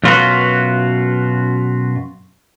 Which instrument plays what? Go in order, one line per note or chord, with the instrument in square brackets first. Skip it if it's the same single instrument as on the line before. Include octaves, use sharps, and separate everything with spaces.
[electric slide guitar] F#2 B2 F4 F#4 B4